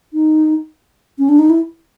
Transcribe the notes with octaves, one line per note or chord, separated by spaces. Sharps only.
D#4
C#4
D4
D#4
E4